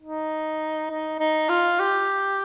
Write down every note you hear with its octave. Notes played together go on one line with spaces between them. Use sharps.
D#4
D#4
D#4
F4
G4